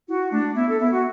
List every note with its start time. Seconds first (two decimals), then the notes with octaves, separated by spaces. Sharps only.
0.09 E4 F#4
0.31 A3 D4
0.55 B3 E4
0.67 A4
0.79 B3 E4
0.91 F#4